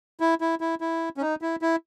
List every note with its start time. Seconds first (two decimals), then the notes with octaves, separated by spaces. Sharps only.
0.20 E4
0.41 E4
0.61 E4
0.81 E4
1.17 C#4
1.21 D#4
1.42 E4
1.62 E4